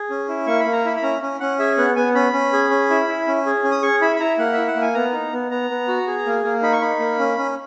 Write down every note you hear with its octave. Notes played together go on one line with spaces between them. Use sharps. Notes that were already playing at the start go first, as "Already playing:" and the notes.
Already playing: G#4
C#4
E4
A#3 C#6
B5
A#3
A#5
E4 B5
B5
C#4 A#5
C#4
C#4 F#5
G#4 E5
B3 F#5
B3 G#5
C#4 B5
C#4
G#4
C#4
E4
E4
C#4
G#4
C#4
D#6
G#4 C#6
E4 B5
B5
E4 A#5
A#3 F#5
E4 E5
F#5
A#3
G#5
B3 A#5
D#4
B3
B3 A#5
B3
F#4
G#4
A#3
A#3
D#4 B5
C#6
D#4 B5
A#3
C#4
C#4